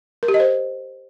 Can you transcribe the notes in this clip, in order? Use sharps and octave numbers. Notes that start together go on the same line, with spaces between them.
A#4
G4
D#5
C5